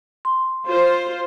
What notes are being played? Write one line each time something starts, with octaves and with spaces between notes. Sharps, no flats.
C6
F4 C5